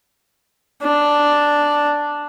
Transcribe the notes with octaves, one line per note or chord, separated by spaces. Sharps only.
D4